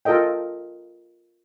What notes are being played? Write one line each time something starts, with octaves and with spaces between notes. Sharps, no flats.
F4 A4 A#4 D#5 G5